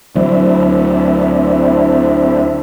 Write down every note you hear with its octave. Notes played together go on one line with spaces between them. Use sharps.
D2 F#3 C4 D4 E4